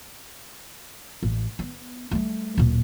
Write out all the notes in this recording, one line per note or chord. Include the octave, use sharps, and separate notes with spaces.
A1
B3
G3 A3
D1 A#2